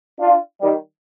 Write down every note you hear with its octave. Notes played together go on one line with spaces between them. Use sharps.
D4 F4
D#3 G3